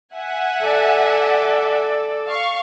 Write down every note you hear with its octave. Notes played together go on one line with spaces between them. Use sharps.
E5 F#5 G#5
A4 D5
F5 C#6